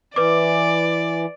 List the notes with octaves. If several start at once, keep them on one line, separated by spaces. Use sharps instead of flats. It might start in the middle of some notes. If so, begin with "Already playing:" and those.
E3 B4 D5 D6